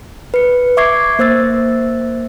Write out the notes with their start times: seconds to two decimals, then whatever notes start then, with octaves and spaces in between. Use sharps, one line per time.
0.34 B4 C#7
0.77 E5 C#6 D6 G#6 C7
1.19 A#3 C5 E5 E6 A6